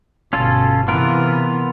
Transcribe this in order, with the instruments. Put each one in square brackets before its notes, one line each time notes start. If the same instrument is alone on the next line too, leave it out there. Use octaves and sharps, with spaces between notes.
[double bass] G1 B2 [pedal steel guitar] C#4 F4 A4
[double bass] C3 E3 [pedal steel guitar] B3 F4 A#4